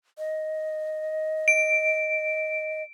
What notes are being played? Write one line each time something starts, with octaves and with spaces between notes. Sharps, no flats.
D#5
D7